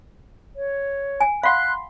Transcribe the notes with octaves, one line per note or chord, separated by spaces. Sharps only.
C#5
G#5
F5 F#5 B5 C6 F#6